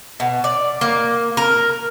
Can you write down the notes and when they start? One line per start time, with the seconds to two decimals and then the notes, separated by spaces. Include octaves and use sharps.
0.20 B2
0.44 D5
0.81 A#3
1.37 A#4